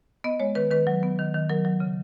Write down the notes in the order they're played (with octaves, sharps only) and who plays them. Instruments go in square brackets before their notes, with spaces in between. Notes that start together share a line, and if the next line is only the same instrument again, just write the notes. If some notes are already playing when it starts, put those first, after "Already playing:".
[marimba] B3 D#5
G#3 C#5
D#3 B4
D#3 B4
F#3
B3
D#3
D#3
F#3 A#4
F#3
C#3